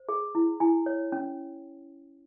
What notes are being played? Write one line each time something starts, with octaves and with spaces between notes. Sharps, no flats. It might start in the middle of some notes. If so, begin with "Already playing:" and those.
Already playing: C5
G#4
E4
E4 G#5
C#5
C#4